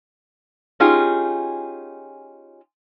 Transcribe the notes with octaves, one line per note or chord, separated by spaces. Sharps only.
C#4 D#4 F4 G4 G#4